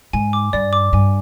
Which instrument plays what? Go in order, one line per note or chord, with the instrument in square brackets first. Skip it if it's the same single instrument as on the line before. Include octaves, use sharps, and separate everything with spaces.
[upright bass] G#2 [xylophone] G#5
[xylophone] D6
[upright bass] G2 [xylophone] D5
[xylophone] D6
[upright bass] G2 [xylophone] G#5